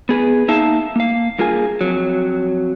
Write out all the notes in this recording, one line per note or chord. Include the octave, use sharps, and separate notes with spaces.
B3 G#4 B4
A#3 D#4 E5 F5 A5
A#3 F5
G2 A#3 F4 G#4 G#5
F2 F#3